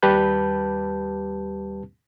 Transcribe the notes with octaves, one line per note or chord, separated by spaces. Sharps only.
D#2 G3 G4 B4 A5 G6